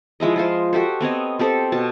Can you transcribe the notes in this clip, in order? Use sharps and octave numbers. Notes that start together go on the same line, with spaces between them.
F3 G#3 E4 D#5
G#3 F4 C5
F#4 G4 A4 C5
B3 C4 C#5 D#5
C4 G4 A4 C5
B2 A5